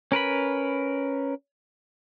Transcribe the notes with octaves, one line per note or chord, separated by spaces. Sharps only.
C#4 A#4 B4 B5